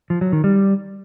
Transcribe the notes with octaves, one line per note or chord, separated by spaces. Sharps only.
F3
F#3
D#3
G3